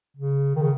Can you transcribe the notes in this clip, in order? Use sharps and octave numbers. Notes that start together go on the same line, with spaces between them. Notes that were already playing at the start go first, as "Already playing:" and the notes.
C#3
D#3
C#3